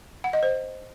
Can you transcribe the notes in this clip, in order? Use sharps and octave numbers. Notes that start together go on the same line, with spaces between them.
F#5
D#5
C5